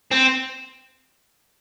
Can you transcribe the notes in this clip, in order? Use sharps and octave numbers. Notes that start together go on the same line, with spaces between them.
C4